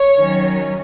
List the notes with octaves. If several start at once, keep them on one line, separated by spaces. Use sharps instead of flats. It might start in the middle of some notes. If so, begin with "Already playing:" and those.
Already playing: C#5
D#3 F#3 C#4